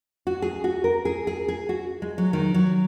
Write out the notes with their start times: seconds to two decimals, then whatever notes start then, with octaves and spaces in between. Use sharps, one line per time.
0.27 F#4
0.42 G#4
0.64 F#4
0.84 A#4
1.05 G#4
1.27 G#4
1.48 G#4
1.69 F#4
2.02 G#3
2.18 F#3
2.33 D#3
2.54 F#3